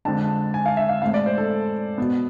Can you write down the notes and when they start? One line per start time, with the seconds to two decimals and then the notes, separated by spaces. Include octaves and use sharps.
0.05 F2 D3 G#3 C4 A5
0.54 G#5
0.66 F5
0.77 E5
0.89 F5
1.02 A2 G#3 C4 F5
1.14 D5
1.26 C5
1.38 A4
1.98 B2 B3